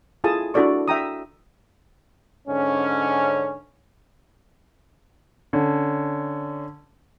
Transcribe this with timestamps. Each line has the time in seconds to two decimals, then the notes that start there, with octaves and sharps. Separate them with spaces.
0.24 E4 F4 G#4 A4 A5 D#6
0.54 D4 E4 F#4 A4 D5 C#6
0.88 E5 G5 A#5 D#6
2.48 G#2 D3 C#4
5.53 D3 C#4